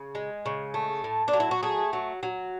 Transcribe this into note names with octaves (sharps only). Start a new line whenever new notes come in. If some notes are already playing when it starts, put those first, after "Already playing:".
Already playing: C#3
G#3
C#3
A3
A2
D4
F#3
E4
F#4
A3 G#4
F#3
F#3